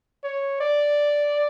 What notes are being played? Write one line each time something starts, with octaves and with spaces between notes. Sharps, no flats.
C#5
D5